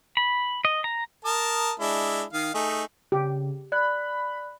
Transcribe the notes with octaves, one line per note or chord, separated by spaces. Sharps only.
B5
D#5
A#5
A#4 A5 D#6
G#3 D4 E4
D#3 F5
A3 D#4 G#4
C#3 G4
D5 B5 F#6